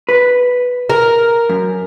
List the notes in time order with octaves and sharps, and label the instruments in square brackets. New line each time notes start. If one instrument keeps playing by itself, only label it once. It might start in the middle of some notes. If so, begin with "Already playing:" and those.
[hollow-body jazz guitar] B4
[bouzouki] A#4
[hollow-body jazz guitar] F#2